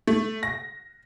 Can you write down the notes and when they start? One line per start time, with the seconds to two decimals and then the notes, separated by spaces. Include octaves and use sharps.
0.07 A3
0.43 A#6